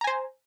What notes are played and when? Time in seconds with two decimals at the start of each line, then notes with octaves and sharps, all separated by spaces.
0.01 A#5
0.04 G#5
0.07 C5